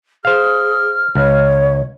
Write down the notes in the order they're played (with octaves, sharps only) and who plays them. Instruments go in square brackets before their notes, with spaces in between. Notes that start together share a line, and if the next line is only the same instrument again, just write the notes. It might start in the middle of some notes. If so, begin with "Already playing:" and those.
[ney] G#4 [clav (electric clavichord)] C5 F5 [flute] F6
[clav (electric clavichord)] C#2 [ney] C#5